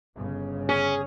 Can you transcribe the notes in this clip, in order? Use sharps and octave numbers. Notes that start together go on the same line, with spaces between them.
G1 C#3
C#4 G#4